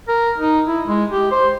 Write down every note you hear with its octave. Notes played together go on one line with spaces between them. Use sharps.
A#4
D#4
E4
G#3
G4
C5